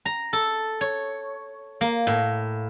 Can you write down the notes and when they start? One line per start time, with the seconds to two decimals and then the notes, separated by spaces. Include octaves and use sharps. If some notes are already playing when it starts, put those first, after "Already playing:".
0.05 A#5
0.33 A4
0.81 C#5
1.81 A#3
2.07 A2